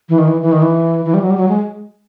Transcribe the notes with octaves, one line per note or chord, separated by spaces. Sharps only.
E3
D#3
E3
E3
D#3
E3
E3
G3
F#3
G3
F#3
G#3